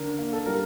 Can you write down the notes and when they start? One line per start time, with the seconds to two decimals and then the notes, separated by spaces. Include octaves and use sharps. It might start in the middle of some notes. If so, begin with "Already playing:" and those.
Already playing: D3 A#4
0.19 A#3
0.33 A4
0.46 G3 A#4